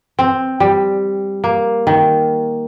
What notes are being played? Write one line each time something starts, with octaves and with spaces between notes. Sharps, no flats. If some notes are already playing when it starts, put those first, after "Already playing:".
C4
G3
A#3
D#3